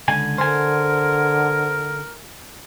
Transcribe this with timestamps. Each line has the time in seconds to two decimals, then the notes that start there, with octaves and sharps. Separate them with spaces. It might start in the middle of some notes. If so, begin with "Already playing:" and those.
0.08 C#2 D3 G#5
0.38 D3 A#4 C5 G#5